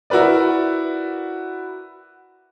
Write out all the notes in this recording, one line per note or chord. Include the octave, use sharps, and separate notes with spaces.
E4 F#4 A#4 B4 D5